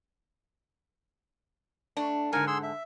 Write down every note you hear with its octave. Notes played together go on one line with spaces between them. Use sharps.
A3 D4
G#2 D3 A#4 G#5
G#4 C6 E6
E5